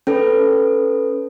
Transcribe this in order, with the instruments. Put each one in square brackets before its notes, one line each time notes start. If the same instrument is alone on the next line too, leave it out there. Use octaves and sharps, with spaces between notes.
[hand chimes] C#4 A4 B4